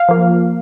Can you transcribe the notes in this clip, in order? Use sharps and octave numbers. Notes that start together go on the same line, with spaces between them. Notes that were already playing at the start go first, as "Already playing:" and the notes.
Already playing: F5
F3 A#3